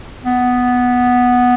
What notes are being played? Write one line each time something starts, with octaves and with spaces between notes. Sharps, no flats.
B3